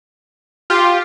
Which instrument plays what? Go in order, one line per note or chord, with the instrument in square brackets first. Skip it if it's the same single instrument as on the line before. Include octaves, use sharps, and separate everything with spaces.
[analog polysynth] F4 G4